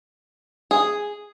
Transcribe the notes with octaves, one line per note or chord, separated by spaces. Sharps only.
G#4